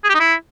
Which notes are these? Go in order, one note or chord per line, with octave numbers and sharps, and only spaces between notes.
G#4
G4
D#4
E4